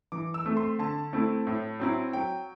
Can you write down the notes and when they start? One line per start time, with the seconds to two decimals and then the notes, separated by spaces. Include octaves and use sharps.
0.12 E3 D6
0.34 E6
0.46 A3 C4
0.57 C6
0.79 D3 A5
1.13 A3 C4 E4
1.47 A2
1.80 F#3 C4 E4
2.13 F#3 G5